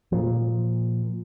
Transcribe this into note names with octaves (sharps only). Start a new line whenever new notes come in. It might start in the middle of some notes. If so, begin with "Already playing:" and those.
A#2 F3